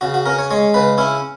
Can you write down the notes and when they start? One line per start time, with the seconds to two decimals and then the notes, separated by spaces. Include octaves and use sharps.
0.01 C#3 F#4
0.14 F#4
0.26 C#4 A#4
0.39 C#5
0.51 G#3 C#5
0.74 C#3 B4
0.98 C#4 E4